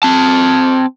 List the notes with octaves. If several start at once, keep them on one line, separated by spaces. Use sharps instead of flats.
C4 A5